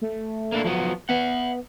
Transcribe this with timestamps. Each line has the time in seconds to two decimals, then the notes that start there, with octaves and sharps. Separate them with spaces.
0.01 A3
0.52 A#3 D4 E4
0.64 F3 F#3 B3
1.09 B3 E5 F#5